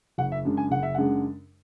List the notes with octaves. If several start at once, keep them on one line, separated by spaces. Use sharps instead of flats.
F#1 F#5
E5
F#2 C#3 G#3 D4
G#5
F#1 F#5
E5
F#2 C#3 G#3 D4 F#5